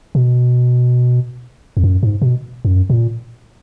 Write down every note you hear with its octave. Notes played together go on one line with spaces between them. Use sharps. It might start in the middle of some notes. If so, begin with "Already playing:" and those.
B2
F2
F#2
G#2
B2
F#2
A#2